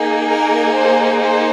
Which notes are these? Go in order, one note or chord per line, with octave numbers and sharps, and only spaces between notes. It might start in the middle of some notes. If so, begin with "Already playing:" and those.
Already playing: A#3 D#4 G#4
A#4
C5
C5